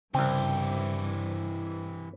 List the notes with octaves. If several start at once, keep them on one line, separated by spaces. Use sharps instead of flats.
C2 G2 C#3 E3 C4 G4